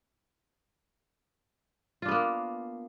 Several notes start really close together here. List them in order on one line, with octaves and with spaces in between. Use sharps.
F4 D4 B3 A#3